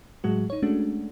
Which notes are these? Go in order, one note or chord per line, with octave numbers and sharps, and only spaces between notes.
A2 F#3 G#3 F#4
D#4 C#5
G#3 A3 C#4 D4 F#4